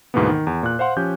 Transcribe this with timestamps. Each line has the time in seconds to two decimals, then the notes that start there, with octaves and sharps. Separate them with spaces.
0.14 D2 G#2 B2 E3 A#3 B3
0.29 D#3
0.47 E2
0.63 A#2 F#6
0.79 C5 F5 F#5 C6
0.97 F3 C#4 G4 G6